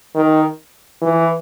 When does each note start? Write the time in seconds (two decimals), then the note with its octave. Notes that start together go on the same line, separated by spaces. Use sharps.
0.15 D#3
1.02 E3